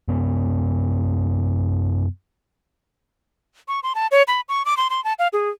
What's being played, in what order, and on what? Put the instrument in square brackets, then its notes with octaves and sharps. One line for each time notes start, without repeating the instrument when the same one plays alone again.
[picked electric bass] F#2 C3 B3
[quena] C#6
C6
A5
C#5
B5
C#6
D6
C6
C6
A5
F5
G#4